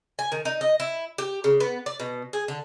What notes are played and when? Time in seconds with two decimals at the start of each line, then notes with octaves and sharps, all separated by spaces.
0.19 G#5
0.32 D#3
0.45 D#4
0.61 D#5
0.80 E4
1.18 G4
1.44 C#3
1.60 B3
1.86 D5
2.00 B2
2.33 G#4
2.48 D3